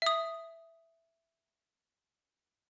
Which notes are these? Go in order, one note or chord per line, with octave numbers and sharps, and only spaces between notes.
E5 D#6